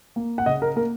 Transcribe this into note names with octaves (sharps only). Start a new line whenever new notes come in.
A#3
F#5
C#3 D#5
A#4
A#3 A#4